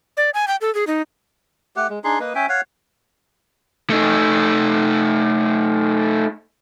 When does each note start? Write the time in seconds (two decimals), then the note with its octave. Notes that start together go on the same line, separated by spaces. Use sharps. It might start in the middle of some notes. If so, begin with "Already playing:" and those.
0.17 D5
0.34 G#5
0.48 G5
0.61 A4
0.75 G#4
0.87 D#4
1.76 A3 G4 F#5
1.90 G#3
2.04 D4 D#4 G#4 C6
2.20 A#3 B4 D#5 D#6
2.35 C#4 E5 G5 G#5
2.49 C#5 F5 F#5
3.90 A3 D#4